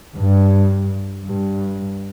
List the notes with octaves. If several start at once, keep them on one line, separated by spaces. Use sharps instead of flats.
G2
G2